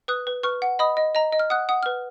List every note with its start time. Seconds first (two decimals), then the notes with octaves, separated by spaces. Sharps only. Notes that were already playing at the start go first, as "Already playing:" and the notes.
0.08 B4 D#6 F#6
0.27 B4
0.43 B4 C#6 F6
0.62 F#5
0.79 D#5 B5 D#6
0.97 D#5
1.15 D#5 A#5
1.33 D#5
1.39 F6
1.50 F#5 D#6 F#6
1.69 F#5 D#6
1.83 B4 F6